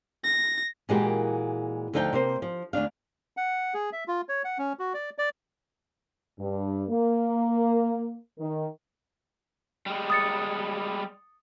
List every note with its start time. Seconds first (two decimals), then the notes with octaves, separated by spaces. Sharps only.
0.24 A#6
0.89 A#2 E3 G#3 A#3 F#4 G4
1.94 D2 D3 F3 D#4 E5 G5
2.13 C3 A#3 C5
2.42 F3
2.73 D2 G2 D4 F5
3.37 F#5
3.74 G#4
3.93 E5
4.08 F4
4.29 C#5
4.44 F#5
4.58 C#4
4.79 F#4
4.94 D5
5.18 D5
6.39 G2
6.89 A#3
8.38 D#3
9.86 G3 G#3
10.10 D#6 A6 C#7